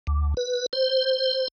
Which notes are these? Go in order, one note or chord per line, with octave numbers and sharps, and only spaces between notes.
D2
B4
C5